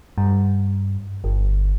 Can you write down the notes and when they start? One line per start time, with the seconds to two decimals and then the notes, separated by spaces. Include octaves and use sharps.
0.18 G2
1.24 G1